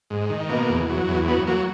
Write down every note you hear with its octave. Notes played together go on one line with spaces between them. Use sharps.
G#2
D#3
B2 A#3
E2
F#3
E2
F#3 B3
F#3 A#3